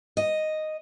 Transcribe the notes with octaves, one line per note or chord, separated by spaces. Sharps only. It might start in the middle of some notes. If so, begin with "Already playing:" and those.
D#5